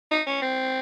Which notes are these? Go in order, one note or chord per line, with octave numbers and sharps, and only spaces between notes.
D#4
C#4
C4